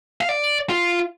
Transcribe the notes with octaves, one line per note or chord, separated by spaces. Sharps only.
F5
D5
F4